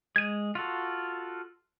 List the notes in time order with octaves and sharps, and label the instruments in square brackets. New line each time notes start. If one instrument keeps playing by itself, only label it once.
[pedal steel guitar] G#3 [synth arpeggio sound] G#6 D#7
[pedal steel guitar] F4 F#4 A4